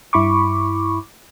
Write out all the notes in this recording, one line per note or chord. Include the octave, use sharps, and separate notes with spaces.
G2 E4 B5 C#6 D6